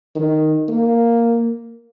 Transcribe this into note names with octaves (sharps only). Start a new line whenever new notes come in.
D#3
A#3